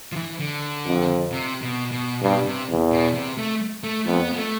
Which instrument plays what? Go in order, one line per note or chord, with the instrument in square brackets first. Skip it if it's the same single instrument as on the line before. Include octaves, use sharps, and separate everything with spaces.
[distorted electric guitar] F3
E3
D3
[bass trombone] F2
[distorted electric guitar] C3
B2
B2
[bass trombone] G2 [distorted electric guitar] B2
[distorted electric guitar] C3
[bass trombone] E2
[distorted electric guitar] B2
C3
A3
A3
[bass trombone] F2 [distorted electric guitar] B3
[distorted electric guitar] B3
A3